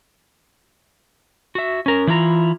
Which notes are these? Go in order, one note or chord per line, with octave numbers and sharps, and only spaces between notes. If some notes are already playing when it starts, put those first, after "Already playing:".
F#4 E5
C#4 A#4
E3 E4 F4 A#5